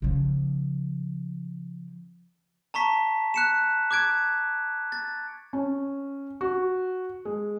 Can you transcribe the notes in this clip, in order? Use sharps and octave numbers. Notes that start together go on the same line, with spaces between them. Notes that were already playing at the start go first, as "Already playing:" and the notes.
C#3 F3
A5 A#5 C#6 B6
F#6 C#7 E7
D6 F#6 G#6 D7
A6
C#4
F#4
G#3